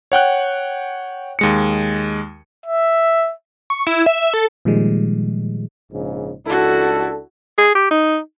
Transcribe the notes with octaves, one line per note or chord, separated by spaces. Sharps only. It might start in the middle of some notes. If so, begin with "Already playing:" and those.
C#5 F#5 G5 F#6
D#2 G#3 C#7
E5
C#6
E4
E5
A4
A#2 D#3 F3 G3 G#3
A#1 G#2 C#3
C#2 D4 E4 F#4 A4
G#4
G4
D#4